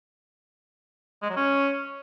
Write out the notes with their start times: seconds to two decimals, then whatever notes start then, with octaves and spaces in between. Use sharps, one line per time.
1.23 G#3
1.30 F#3
1.37 C#4